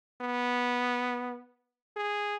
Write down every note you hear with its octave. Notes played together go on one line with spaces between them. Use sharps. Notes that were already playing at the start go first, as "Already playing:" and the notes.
B3
G#4